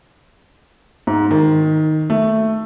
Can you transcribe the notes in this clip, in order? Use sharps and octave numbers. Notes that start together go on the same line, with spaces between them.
G#2
D#3
A3